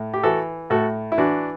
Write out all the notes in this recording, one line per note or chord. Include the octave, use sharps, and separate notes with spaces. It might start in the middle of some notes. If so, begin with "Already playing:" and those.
Already playing: A2
G4
E3 F#4 A4
A2 F#4 A4
E4
E3 D4 F#4